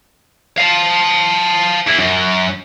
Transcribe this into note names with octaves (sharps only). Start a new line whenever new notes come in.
F5 A5
E2 E4
F#2